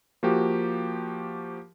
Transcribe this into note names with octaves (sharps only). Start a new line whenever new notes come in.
F3 A#3 F#4 G4